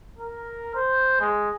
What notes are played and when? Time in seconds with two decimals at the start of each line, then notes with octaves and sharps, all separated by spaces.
0.19 A#4
0.75 C5
1.20 G#3